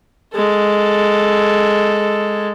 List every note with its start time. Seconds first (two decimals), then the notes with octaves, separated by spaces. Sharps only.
0.34 G#3 A4